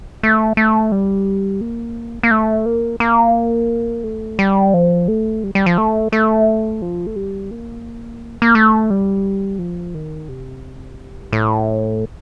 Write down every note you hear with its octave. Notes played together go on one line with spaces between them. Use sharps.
A3
A3
G3
A#3
A#3
A3
A#3
A#3
A3
G3
F3
A3
G3
G3
F3
A3
A3
F3
A3
G3
A#3
A#3
A3
G3
F3
D#3
C3
G2
A2